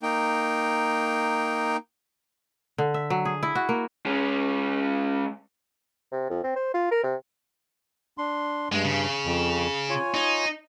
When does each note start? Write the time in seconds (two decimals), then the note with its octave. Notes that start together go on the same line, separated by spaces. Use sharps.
0.03 A#3 D#4 G5
2.78 D3
2.94 E5
3.10 F#3
3.25 G#4
3.43 E4
3.55 F#4
3.69 A#3
4.06 G#3 C#4
6.12 C3
6.30 F2
6.43 C4
6.56 C5
6.74 F4
6.91 A#4
7.03 C3
8.18 D4 C6
8.72 G2 G#3
8.84 C#3
9.25 F2
9.90 F4 C#5 G#5
10.14 D#4